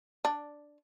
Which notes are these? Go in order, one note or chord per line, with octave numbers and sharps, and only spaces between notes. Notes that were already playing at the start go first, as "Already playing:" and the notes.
D4